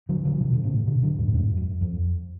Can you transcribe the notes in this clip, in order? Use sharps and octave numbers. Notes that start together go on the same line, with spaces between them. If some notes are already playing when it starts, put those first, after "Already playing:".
D3 F#3
D3 F#3
F3
B2 D3
D3
A2 C#3
B2 D3
D3 F#3
F2 G#2
A2
F2 G#2
F#2
F2